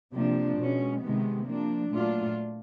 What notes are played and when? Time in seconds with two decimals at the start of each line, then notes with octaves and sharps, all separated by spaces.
0.12 C3 F3 A#3 D4
0.57 B2 G#3 C#4
1.01 C3 D#3 G#3 B3
1.45 F3 A#3 D4
1.90 A#2 F#3 A3 D4 F4